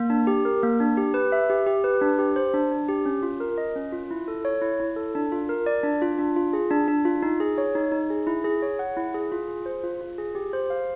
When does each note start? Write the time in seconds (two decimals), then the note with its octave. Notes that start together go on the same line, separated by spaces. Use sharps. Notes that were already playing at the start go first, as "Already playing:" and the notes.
Already playing: A#3
0.10 D4
0.27 G4
0.45 A#4
0.63 A#3
0.80 D4
0.97 G4
1.14 B4
1.32 E5
1.50 G4
1.66 G4
1.84 B4
2.01 D4
2.19 G4
2.36 C5
2.54 D4
2.71 D4
2.89 G4
3.06 C#4
3.23 F4
3.40 A#4
3.58 D#5
3.76 C#4
3.92 F4
4.11 E4
4.28 A4
4.45 C#5
4.62 E4
4.80 E4
4.96 A4
5.15 D4
5.32 F4
5.49 A#4
5.66 D5
5.83 D4
6.02 F4
6.19 D4
6.36 F4
6.53 G#4
6.71 D4
6.88 D4
7.05 F4
7.22 D#4
7.40 G#4
7.58 C#5
7.75 D#4
7.92 D#4
8.10 G#4
8.27 E4
8.44 G#4
8.62 C#5
8.79 F#5
8.97 E4
9.14 G#4
9.32 F4
9.49 G#4
9.66 C5
9.84 F4
10.01 F4
10.18 G#4
10.35 G4
10.53 C5
10.70 F5